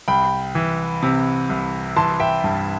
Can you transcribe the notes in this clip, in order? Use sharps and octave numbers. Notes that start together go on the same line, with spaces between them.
C2 G5 B5
E3
C3
C2
E3 A5 C6
E5 G5
G2